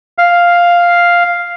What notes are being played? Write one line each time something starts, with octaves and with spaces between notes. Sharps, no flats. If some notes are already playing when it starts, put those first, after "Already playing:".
F5